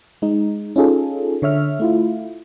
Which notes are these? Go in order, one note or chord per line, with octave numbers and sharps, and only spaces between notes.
G#3 D#4
C#4 D#4 F4 G#4 A4
D3 C#5 E5 F6
A3 E4 F4